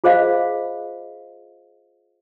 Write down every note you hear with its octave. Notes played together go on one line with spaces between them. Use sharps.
F4 G#4 C5 D#5 F5